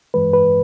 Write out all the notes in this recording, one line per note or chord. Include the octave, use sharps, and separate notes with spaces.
G2 E3 G#3 B4
B4